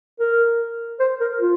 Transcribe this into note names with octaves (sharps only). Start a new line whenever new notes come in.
A#4
C5
A#4
F4